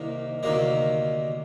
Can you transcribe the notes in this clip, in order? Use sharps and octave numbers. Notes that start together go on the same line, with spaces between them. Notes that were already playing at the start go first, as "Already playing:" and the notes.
Already playing: C2 C3 D#3 A#3
D2 C3 D#3 A#3